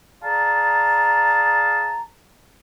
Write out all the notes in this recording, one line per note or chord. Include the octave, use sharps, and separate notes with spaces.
G#4 D5 F5 A5 A#5